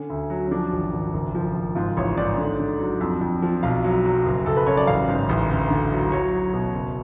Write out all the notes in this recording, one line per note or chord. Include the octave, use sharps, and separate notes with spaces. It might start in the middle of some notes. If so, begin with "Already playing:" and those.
Already playing: D3 C#4
D2
F#3
C#4
F3 D4
G#1
G#1
F#1
F3
F#1
G#2 F4
A1 C#5
G#2 D5
D3
D3
F#3
F2
F2
F3
B1 F5
F#3
F#3
F#1
F#1 A4
B4
F#2 C#5
D5
A1 F5
G#2
A1
D2
D3
F#3
F#3 C#5
F#3
B2
F#1